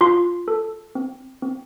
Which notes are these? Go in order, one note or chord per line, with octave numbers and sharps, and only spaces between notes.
F4 C6
A4
C4
C4